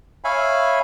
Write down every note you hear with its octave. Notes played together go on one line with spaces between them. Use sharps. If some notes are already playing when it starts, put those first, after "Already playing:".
C#5 E5 F5 G#5 B5